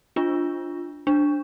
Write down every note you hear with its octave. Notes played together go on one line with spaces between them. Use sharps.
D4 F4
D4